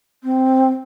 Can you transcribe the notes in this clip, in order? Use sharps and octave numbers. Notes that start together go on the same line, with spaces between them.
C4